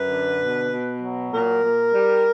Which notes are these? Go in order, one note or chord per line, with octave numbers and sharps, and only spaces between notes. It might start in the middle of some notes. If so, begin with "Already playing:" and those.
Already playing: F#2 B4
D3
B2
B2
F#3
A#2 A#4
A#2
G3